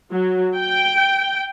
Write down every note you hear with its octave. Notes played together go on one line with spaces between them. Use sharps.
F#3
G5